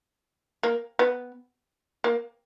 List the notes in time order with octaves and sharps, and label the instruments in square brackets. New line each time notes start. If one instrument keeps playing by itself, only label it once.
[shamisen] A#3
B3
A#3